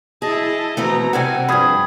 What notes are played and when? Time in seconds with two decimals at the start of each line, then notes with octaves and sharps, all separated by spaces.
0.22 E4 G#4 D#5 A5
0.77 B2 E3 A3 C4 A#5
1.13 C3 G3 C4 A4 F#5 G#5
1.49 G2 F3 G#4 B5 D#6 G#6